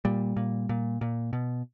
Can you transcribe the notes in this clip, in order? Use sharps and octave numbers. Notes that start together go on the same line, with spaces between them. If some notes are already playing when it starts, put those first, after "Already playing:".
A#2 G3
A#2
A#2
A#2
B2